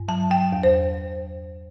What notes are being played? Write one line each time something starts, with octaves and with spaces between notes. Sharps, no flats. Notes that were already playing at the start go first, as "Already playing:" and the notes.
Already playing: G2
F#3 A5
F#3 G5
E2
C5